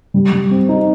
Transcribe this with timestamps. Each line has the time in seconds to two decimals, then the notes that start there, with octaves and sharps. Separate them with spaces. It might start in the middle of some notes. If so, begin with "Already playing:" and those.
0.14 G3
0.32 G3
0.51 C4
0.69 D#4